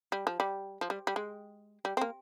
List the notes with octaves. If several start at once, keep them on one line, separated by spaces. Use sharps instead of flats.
G3
F3
G3
F3
G3
G3
G#3
G3
C4
A#3